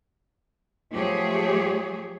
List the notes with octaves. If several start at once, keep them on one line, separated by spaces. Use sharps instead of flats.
F3 F#3 A3 G4 G#4 C#5